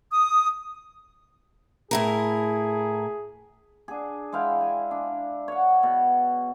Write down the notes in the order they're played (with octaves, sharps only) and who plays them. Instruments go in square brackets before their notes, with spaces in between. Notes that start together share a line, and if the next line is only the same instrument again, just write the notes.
[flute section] D#6
[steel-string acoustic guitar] A2 E4 A#4 [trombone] G#4
[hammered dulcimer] D4 G#4
G#3 E4 F5 G5
G#5
D4
C#5 F#5
B2